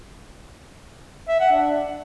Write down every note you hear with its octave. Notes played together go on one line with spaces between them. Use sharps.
E5
F#5
D4